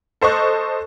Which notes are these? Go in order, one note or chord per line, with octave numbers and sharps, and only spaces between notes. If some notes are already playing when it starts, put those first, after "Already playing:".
A4 C5 D#5 C#6 F#6